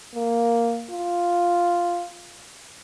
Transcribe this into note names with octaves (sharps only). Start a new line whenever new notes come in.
A#3
F4